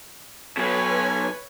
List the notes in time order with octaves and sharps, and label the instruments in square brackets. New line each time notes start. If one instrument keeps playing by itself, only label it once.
[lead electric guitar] B2 F#3 [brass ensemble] A4 G#5 [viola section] B4 C#5